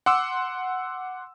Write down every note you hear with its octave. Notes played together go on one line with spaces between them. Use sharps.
F#5 C6 D6 E6